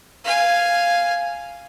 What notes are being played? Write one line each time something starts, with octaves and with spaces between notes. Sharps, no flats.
F5 G#5